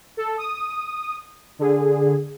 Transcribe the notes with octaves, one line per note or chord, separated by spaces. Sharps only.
A4
D#6
D3 G#4